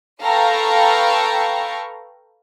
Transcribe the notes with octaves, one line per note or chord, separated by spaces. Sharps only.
A4 B4 F5 G5 A#5 C#6